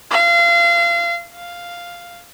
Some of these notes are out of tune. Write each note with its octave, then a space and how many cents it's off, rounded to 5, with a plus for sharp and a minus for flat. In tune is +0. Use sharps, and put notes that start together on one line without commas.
F5 -30
F5 +0